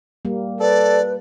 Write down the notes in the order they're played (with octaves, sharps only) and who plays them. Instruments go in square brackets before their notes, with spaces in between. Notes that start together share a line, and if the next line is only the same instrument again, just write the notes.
[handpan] G3 A#3
[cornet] A4 [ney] B4 [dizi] D5